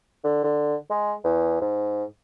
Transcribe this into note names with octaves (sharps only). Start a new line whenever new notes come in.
D3
D3
G#3
E2
G#2